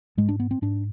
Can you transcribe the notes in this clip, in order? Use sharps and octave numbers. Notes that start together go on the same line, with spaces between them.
G#2 G#3
D4
B3
C4
G#2 D4